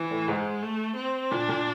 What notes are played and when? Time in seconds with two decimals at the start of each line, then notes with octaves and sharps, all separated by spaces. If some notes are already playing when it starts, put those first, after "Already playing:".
Already playing: E3
0.11 A2
0.28 G#2 G#3
0.63 A3
0.96 C4
1.31 A#2 D4
1.49 A#2